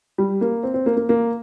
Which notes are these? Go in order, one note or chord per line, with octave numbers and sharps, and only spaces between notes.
G3
A#3
C4
C4
A#3
A#3
A#3